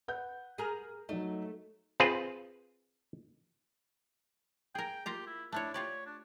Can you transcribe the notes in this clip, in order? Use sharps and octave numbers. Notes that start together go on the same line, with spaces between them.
B4 F#5 G6
G#4 A#4
F#3 A3 D#4
C4 F4 G#4 B4
G#4 A#4 G5
A#3 F4 G4 A#5
E4
A3 D4 E4 C#5
F4 G4 C#5 D5
D4